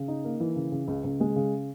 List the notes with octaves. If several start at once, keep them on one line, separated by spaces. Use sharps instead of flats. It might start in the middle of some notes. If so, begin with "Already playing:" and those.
Already playing: C#3
D#4
A#3
E3
C#3
C#3
C#2
C#2
G#3
C#3